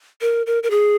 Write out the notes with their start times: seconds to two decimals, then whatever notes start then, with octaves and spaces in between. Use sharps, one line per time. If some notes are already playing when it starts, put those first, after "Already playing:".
0.21 A#4
0.46 A#4
0.63 A#4
0.70 G#4